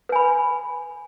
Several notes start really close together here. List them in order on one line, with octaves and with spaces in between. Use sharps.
B4 G#5 B5